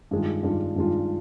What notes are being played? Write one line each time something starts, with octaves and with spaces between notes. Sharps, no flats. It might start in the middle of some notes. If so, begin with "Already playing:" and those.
G2 D#3 G#3 D4 F4
G2 D#3 G#3 D4 F4
G2 D#3 G#3 D4 F4